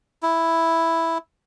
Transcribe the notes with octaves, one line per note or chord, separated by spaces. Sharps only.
E4